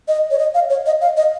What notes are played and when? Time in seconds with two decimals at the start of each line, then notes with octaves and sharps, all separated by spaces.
0.08 D#5
0.31 C#5
0.39 D#5
0.54 F5
0.70 C#5
0.86 D#5
1.01 F5
1.17 D#5